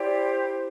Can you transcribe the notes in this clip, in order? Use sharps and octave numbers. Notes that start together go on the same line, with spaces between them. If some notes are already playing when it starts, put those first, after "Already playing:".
Already playing: E4 G4 C5 D5